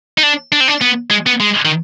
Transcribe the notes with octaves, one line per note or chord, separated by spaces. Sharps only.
D#4
D4
D4
C4
D4
B3
G#3
B3
G#3
D#3